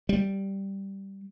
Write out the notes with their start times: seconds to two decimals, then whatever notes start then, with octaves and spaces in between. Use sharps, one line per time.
0.09 G3